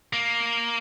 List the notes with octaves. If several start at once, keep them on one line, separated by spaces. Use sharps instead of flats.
A#3